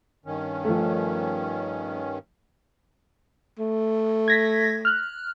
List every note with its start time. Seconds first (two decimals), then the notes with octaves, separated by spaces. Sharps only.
0.26 G2 D#3 C#4
0.65 F3 A3
3.59 A3
4.28 G#6 A#6 B6
4.85 F6 F#6